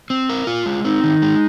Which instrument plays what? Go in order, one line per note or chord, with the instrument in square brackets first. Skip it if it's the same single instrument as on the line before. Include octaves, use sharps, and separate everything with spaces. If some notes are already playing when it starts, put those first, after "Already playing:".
[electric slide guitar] C4
A#4
F4
G#3
[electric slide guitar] C4 [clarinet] D#4
[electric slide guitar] D#3
G#3